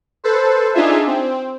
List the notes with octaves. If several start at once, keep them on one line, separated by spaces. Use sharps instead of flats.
A4 B4 C5
D4 D#4 F4 G#4 E5
C4